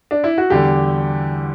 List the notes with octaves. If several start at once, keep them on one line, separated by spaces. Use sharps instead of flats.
D4
E4
F#4
E2 D3 G3 G4